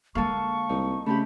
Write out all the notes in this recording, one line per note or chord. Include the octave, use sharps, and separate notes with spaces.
D3 G#3 A#3 A4 F5 C#6
C2 D#4
C#3 A3 C4 G4 B5